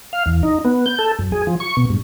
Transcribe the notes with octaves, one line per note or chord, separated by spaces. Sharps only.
F5
E2
D#4
B3
G6
A4
F#2
G#4
F3
C#6
B2
G2